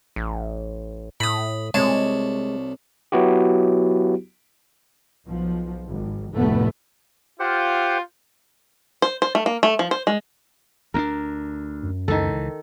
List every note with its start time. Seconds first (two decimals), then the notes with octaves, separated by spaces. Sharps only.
0.16 A1
1.20 A2 B5 D#6
1.74 C2 G#3 C#5 A5
3.12 F#3 B3 E4 F#4 G4
5.27 B1 F3
5.87 G#1
6.36 F1 D2 A2 A3 B3
7.40 F4 G4 C5 F#5
9.02 C5
9.22 C5
9.35 A3
9.46 A#3
9.63 A3
9.79 F3
9.91 C5
10.07 G#3
10.94 D2 C4 D4 A#4
11.83 F#2
12.08 C#2 D#3 E3 A4